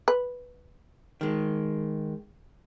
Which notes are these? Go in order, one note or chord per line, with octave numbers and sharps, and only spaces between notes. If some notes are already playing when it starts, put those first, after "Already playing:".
B4
D#3 G#3